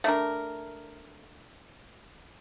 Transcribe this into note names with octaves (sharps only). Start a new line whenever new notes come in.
A3 D4 A#4